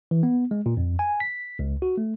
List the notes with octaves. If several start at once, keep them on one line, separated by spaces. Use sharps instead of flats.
E3
B3
G#3
A#2
F2
G#5
B6
C#2
F#4
A3